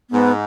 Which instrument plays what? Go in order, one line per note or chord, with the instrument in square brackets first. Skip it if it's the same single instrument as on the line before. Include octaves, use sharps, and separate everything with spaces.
[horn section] G#2 [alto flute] B3